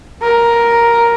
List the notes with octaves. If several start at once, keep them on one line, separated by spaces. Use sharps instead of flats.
A#4